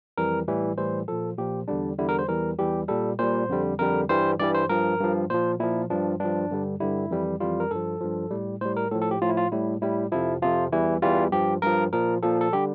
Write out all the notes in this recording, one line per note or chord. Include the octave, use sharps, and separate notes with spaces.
F2 E3 G3 A#4
A2 E3 G3
A2 E3 G3 C5
A#2 F3 A4
A#2 F3 G4
E2 D3 G3 D4
E2 D3 G3 E4
A#4
C5
E2 E3 G3 A#4
E2 E3 G3 G4
A#2 G3 A4
A#2 G3 C5
F2 D3 G3
F2 D3 G3 A#4
G2 E3 G3 C5
G2 E3 G3 D5
C5
G2 F3 A#4
G2 F3
A#2 F3 C5
A#2 F3 E4
G2 F3 D4
G2 F3 D4
G2 D3 G3
G2 D3 G3 E4
F2 E3 G3
F2 E3 G3 F4
A#4
G2 F3 A4
G2 F3
A2 G3
A2 G3 C5
A#4
A2 F3 A4
A4
G4
A2 F3 F4
E4
F4
A2 G3 E4
A2 G3 E4
F2 C3 F3 E4
F2 C3 F3 F4
E2 E3 G3 E4
E2 E3 G3 F4
G2 F3 G4
G2 F3 A#4
A#2 F3 A#4
A#2 F3 A4
A4
D3 G3 G4